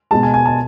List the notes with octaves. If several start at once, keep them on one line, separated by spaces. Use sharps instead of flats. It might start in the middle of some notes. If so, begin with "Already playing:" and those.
B2 G#3 A5
G#5
G#5
A5